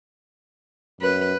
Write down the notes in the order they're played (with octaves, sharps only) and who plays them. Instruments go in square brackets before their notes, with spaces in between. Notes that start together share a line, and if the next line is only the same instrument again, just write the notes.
[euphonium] F#2 [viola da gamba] B4